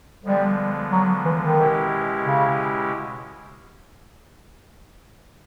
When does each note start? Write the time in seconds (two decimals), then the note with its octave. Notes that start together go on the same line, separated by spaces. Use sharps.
0.25 D3 F3 G3 G#3 B3
0.92 F#3
1.25 E3
1.42 D#3
1.58 B2 G#3 C#4 E4 G4
2.25 C#3